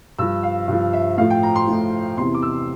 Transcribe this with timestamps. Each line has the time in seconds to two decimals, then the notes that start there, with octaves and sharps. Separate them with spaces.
0.18 G2 F3 E6
0.43 F5
0.68 G2 F3
0.93 E5
1.18 A2 F3 F5
1.30 G5
1.43 A#5
1.56 C6
1.68 A2 F3
2.17 E2 C3 E3 C6
2.34 D6
2.42 E6